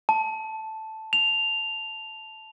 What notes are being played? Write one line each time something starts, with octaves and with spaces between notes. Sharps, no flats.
A5
F7